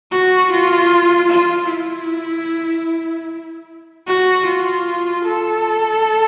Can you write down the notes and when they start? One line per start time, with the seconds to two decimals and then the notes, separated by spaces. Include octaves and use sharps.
0.11 F#4
0.51 F4
1.30 F4
1.70 E4
4.06 F#4
4.46 F4
5.25 A4